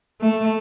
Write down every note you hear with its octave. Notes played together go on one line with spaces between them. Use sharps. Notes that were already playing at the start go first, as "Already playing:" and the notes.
A3